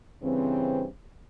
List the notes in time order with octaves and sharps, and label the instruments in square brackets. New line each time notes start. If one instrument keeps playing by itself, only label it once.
[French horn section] G2 C#3 E3 C4